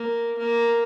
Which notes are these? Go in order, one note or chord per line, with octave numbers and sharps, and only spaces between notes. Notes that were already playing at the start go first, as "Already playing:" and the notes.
Already playing: A#3
A#3